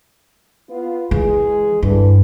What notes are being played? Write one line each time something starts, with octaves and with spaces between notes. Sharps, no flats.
B3 F4
E3 G#3 G#4
G2 D3 E3